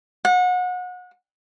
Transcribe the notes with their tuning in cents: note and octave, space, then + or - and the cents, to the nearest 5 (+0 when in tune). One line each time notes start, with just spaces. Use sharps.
F#5 -30